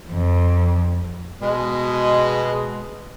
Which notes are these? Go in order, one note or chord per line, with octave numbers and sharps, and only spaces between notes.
F2
B2 G#3